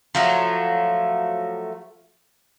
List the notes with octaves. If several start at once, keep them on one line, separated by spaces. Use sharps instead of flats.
F3 F#3 A3